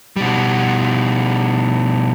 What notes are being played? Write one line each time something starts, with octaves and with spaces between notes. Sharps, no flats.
B2 G3